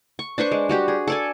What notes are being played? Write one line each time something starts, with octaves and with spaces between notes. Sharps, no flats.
C#6
D4 B4 C5 C#6
G#3
G3 F#4 G4
G#4
A4 D5 G#5